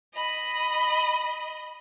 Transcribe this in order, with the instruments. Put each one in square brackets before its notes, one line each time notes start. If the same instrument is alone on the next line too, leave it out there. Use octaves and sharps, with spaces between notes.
[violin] D#5 B5